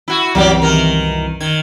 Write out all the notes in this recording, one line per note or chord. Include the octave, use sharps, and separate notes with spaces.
E4 F#4
C2 F#2 E3 F#3 G4 D5
D#3 A#4
D#3 G#6